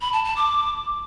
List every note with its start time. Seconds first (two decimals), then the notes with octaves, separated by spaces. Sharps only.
0.01 B5
0.13 A5
0.25 A5
0.36 D6